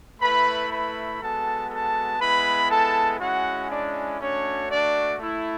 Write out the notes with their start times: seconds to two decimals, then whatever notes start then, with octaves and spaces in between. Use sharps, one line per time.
0.20 A3 E4 B4 B5
0.71 B4 B5
1.20 G#3 B3 F#4 A4 A5
1.70 A4 A5
2.20 G#3 B3 E4 B4 B5
2.70 A4 A5
3.20 G#3 C#4 E4 F#4 F#5
3.70 D4 D5
4.20 A3 C#4 D4 F#4 C#5
4.71 D4 D5
5.19 A3 E4